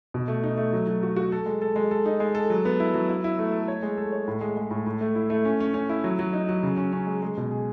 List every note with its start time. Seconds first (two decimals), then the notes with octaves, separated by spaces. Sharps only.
0.14 B2
0.28 A3
0.44 D#4
0.57 A3
0.73 F#3
0.87 F#3
1.03 F#4
1.16 F#4
1.32 A4
1.46 G#3
1.62 A4
1.76 G#3
1.91 A4
2.06 D#4
2.20 G#3
2.35 A4
2.50 F#3
2.65 B3
2.80 E4
2.94 F#3
3.09 E4
3.24 E4
3.39 A3
3.53 A4
3.68 C#5
3.83 G#3
3.98 A4
4.12 C#5
4.28 A2
4.41 G#3
4.57 G#3
4.71 A2
4.86 A2
5.01 A3
5.15 E4
5.30 A3
5.45 C#4
5.60 C#4
5.74 C#4
5.89 E4
6.04 F#3
6.19 F#3
6.33 D#4
6.49 F#3
6.63 C#3
6.77 C#4
6.93 C#4
7.07 G#3
7.22 G#3
7.37 B2
7.51 G#4